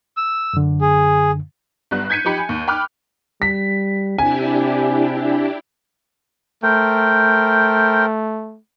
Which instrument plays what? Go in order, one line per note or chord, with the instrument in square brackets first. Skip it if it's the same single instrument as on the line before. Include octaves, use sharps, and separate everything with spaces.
[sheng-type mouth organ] E6
[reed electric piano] F#2 D3
[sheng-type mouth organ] G#4
[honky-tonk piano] G1 G3 B3 F#6
G6 G#6 B6 C#7 D#7
F3 D#4 G4 B5 C#7
G#5
D#2
G5 B5 D6 F6 F#6
[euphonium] G3 [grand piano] B6
[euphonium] C3 [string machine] D4 E4 G4 [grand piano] G#5
[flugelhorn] A3 [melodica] A#4 C5 G5